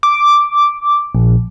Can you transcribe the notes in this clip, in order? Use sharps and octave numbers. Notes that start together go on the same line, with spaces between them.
D6
A#1